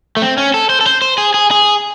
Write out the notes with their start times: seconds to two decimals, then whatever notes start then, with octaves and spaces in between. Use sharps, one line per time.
0.17 A3
0.22 C4
0.38 C#4
0.54 A4
0.70 C5
0.81 A4
0.86 C5
1.02 C5
1.18 G#4
1.34 G#4
1.51 G#4